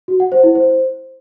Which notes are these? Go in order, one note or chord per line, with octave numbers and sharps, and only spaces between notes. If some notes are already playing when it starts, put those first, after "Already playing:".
F#4
F#5
C5
E4
C5